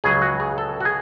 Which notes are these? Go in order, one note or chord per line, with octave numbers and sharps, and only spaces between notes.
C#2 C#3 F#3 G#4
F#4
G#4
A4
F#4
G#4